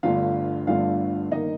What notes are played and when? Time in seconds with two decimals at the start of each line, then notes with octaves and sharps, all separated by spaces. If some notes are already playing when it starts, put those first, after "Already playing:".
0.03 G1 G2 D3 A3 F4 F5
0.67 G1 G2 D3 A3 F4 F5
1.31 G1 D#3 A#3 D#4 D#5